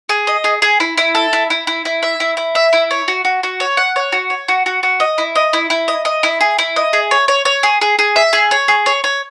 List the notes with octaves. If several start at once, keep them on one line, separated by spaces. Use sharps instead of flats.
G#4
D#5
G#4
G#4
E4
E4
A4
E4
E4
E4
E4
E5
E4
E4
E5
E4
C#5
F#4
F#4
F#4
C#5
F#5
C#5
F#4
C#5
F#4
F#4
F#4
D#5
E4
D#5
E4
E4
D#5
D#5
E4
G#4
E4
D#5
G#4
C#5
C#5
C#5
G#4
G#4
G#4
E5
G#4
C#5
G#4
C#5
C#5